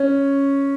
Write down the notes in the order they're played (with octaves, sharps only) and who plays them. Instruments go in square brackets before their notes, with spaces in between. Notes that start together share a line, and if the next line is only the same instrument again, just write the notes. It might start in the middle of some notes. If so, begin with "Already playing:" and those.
Already playing: [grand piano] C#4